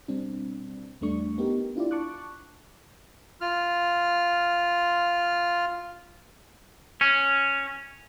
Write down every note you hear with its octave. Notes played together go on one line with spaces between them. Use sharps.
B2 G3 C4 D4
E2 G3 A3 D4 C#6
B3 D#4 G4 A#4
D4 E4 F4 G4 D5
A5 C#6 D6 F#6
F4 F6
C#4